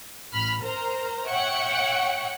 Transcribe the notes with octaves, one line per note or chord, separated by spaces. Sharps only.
A1 B5 F6
A#4 C5 A#5
C#5 E5 F#5 G5 C#7